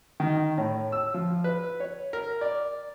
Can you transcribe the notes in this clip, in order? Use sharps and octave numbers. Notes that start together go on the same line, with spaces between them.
D#3
A2
E6
F3
B4
C#5
A#4
D5